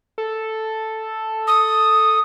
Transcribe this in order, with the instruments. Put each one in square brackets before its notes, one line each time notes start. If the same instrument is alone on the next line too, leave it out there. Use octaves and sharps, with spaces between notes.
[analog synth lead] A4
[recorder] D#6